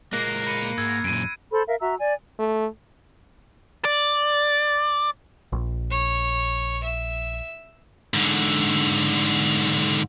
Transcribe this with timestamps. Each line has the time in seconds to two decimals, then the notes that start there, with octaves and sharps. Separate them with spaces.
0.13 A#2 G#3 A#3 A#4 F#6 A#6 C7
0.47 B5 C#7 D#7
0.78 G#2 E6 G#6
1.04 F#2 A#2 D7 D#7
1.52 A4 C5 B5 C6
1.67 A#4 E5 F5
1.80 F#4 E5 A#5 E6
1.99 D5 G#5
2.39 A3
3.85 D5
5.52 A#1
5.91 C#5
6.83 E5
8.14 G#2 D3